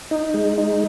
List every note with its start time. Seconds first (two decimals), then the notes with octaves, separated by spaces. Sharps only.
0.11 D#4
0.34 G#3
0.58 D#4